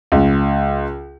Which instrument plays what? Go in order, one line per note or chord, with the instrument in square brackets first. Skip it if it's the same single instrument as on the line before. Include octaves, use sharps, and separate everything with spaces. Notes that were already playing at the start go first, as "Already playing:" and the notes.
[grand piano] C#2